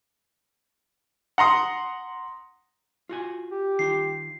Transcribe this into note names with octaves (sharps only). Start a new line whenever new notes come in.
F#5 A#5 C6 D#6
F4 F#4 G#5
G4
D#3 D#4 F4 C7